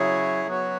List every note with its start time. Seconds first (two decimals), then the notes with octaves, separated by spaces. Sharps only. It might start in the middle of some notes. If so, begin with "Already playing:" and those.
Already playing: C#3 F#3 E4 G#4 C#5
0.46 F#3 B3 F#4 C#5